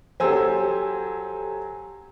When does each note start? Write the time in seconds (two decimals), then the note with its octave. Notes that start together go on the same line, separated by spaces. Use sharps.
0.20 F#3 G4 A4 C5 G#5 E6